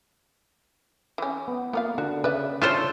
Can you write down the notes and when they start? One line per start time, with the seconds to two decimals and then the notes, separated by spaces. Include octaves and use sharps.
1.18 E3 C#4
1.48 B3
1.73 A#3 B3 F4 F5
1.98 D3 F#4
2.24 C#3 B4 D5 E5
2.62 E3 D4 F4 A4 C5 C#5